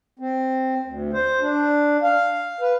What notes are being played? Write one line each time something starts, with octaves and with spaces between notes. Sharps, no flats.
C4
D2
C5
D4
F5
B4